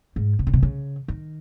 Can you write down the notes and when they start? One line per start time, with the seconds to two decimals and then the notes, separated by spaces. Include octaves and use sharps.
0.16 G#2
0.39 C3
0.47 C#3
0.53 C3
0.63 C#3
1.08 D#3